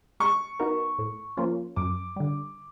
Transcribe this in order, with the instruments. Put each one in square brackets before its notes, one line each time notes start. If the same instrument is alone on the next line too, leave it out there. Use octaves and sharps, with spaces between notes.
[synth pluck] G#3 [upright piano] C#6
[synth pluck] B3 D#4 F#4 A#4
A2
F3 A#3 C#4 F4
[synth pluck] F#2 [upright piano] D6
[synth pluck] D3 G3